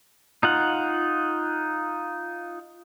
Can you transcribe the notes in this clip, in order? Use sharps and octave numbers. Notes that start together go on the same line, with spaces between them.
D#4 F4 F#5